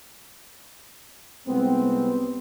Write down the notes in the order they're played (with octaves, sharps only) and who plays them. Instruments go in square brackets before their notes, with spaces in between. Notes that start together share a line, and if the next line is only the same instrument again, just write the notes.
[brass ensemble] C2 G#3 C4 [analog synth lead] B3